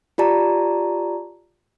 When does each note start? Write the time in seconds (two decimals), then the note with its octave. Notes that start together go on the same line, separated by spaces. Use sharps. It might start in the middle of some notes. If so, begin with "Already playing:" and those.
0.18 F4 G4 D5 A5 A#5